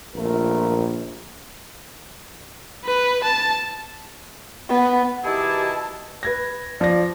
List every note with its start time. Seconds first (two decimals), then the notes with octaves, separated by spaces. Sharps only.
0.15 A#1 A3 F4 A#4
2.85 B4
3.24 A5
4.69 B3
5.24 B2 D#3 E4 G4 G#4 A5
6.23 B4 G#6 A#6
6.81 F3 D5 A#6